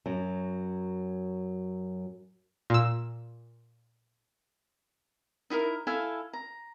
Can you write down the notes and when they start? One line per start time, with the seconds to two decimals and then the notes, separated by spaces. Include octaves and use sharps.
0.06 F#2 F#3
2.70 A#2 E6
5.50 D#4 E4 A4 A#4
5.87 E4 A4 F5 G#5
6.33 A#5